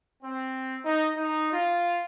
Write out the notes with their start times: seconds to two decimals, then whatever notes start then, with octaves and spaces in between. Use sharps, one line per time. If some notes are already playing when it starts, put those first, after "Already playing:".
0.23 C4
0.84 D#4
1.17 D#4
1.53 F4